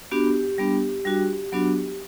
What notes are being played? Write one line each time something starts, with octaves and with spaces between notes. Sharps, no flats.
B3 D4 F#4 G4
G3 B3 D4
G3 D4 F#4
F#3 B3 D4 F#4